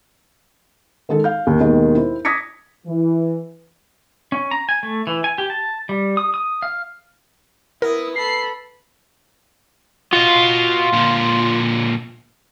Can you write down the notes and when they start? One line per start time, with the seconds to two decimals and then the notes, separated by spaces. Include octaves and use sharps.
1.09 D#3 G#3 G#4 A4
1.24 F5 G6
1.47 D#2
1.61 D#2 B2 D#3 G#3
1.95 E4 C5
2.25 D6 D#6 G#6 A#6 B6 C#7
2.86 E3
4.32 C#4
4.51 A#5
4.69 G#5
4.83 A3
5.07 E3
5.24 G#5
5.38 G4
5.50 A5
5.89 G3
6.17 D#6
6.34 D#6
6.62 F5
7.82 B3 E4 A#4 D#6
8.16 A4 B5 C7
10.13 F4 F#4 D#5
10.93 A#2 D3